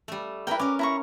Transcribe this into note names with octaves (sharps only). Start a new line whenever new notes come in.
G3 A3
E4 A#4 B4 G5
C#4 A#4 D6
E4 A#5 C#6